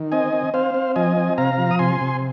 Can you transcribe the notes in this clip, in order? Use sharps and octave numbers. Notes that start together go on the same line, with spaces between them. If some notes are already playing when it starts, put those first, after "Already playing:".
Already playing: D#3
C4 D#5 G#5
C4
C4 C5 F5
C4
F3 D#5 G#5
C4
C3 F5 A#5
F3
D#6
C3 G#5 C6
C3